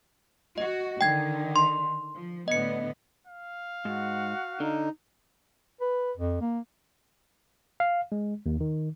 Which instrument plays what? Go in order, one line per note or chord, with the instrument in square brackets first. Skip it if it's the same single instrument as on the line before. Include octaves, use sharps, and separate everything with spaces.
[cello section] F#4 [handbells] D#5
[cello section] D3 D#3 [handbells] G5 G#6
[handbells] C6
[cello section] F3
[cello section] A2 D3 B3 [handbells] D#5 C#7
[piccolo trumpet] F5
[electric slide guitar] G#2 [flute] F#4
[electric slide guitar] D3 [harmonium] D#4
[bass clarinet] B4
F2
A#3
[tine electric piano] F5
G#3
D#2
D#3